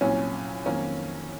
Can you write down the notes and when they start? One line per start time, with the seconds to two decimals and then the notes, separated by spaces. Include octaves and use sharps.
0.01 C2 A#2 F#3 C#4
0.66 F2 D#3 F#3 A#3 C#4